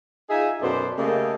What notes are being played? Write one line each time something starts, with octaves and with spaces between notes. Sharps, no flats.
D#4 F4 G#4 D#5 E5 G#5
F#2 B2 B3 A4 C5 D5
C#3 A3 A#3 G4 A4 D#5